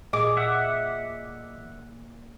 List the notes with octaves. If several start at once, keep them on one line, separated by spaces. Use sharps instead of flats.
A#2 G#4 D#5 D6
E5 F#5